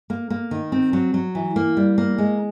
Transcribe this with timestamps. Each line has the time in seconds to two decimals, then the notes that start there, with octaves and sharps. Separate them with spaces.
0.10 A#3
0.30 A#3
0.51 D#3
0.72 C4
0.93 F#3
1.14 F#3
1.35 E3
1.56 A#3
1.77 G3
1.98 A#3
2.18 G#3